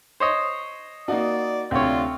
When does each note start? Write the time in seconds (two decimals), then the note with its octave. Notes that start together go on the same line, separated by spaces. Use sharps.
0.20 C5 C#5 D#5
1.08 A#3 D#4 F#4 D5
1.71 D2 C3 C4 D4 F4 C#5